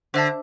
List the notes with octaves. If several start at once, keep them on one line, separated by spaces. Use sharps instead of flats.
D3 C5 E5 A5